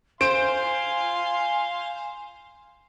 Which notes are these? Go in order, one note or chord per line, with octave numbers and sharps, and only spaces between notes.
C5 F5 G#5 C6 D7